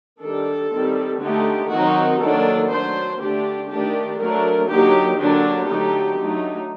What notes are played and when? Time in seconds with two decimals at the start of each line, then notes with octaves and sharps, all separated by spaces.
0.21 D#3 G3 D4 A4
0.72 D#3 G3 C4
1.21 D3 A3 D#4 G4
1.71 D#3 F#3 C4 D#4 F#4
2.20 D#3 F#3 A#3 D4 A4
2.70 F#3 A3 D4 C5
3.20 D3 A3 D4 G4
3.69 D#3 A3 D4 G4
4.19 F#3 A3 D4 A#4
4.69 D3 F#3 A#3 D#4 G4
5.19 D3 F#3 A#3 D4 G4
5.68 D3 F#3 A3 D#4
6.18 D3 F#3 A3 D#4